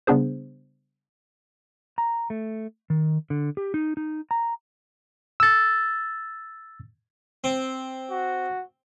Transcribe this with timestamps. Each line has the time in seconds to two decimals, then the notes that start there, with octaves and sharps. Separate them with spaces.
0.07 C#3 G3 B3 D4 G#4 C5
1.98 A#5
2.30 A3
2.90 D#3
3.30 D3
3.57 G4
3.74 D#4
3.97 D#4
4.31 A#5
5.40 E6 A6
7.44 C4
8.11 F#4